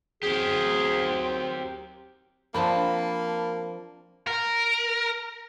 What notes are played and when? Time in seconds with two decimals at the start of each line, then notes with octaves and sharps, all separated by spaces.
0.23 F#3 C4 G4 G#4 A#4
2.54 F3 A#3 C4 D4 A5 B5
4.27 A#4